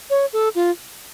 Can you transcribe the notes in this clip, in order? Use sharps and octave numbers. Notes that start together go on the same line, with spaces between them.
C#5
A4
F4